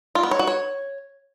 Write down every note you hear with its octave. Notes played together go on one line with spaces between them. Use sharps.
F4
B3
C#5
F#4
C#5